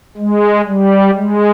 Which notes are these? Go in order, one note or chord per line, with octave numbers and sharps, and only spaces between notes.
G#3
G3
G#3